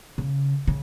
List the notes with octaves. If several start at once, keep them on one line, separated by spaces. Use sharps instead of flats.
C#3
C#3